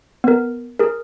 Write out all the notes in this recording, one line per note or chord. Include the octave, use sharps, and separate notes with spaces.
B3 A#4
G#4 A#4